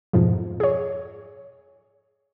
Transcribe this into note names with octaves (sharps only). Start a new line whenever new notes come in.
F2 G#2 B2 F3
G#4 C#5